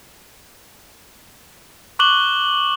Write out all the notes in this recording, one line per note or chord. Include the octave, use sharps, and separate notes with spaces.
C#6 D6 F#6 F#7 G7